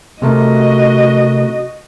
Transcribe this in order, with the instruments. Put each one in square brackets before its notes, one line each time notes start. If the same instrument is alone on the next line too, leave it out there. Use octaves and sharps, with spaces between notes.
[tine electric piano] C3 A3 A#4 [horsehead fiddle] F#4 D#5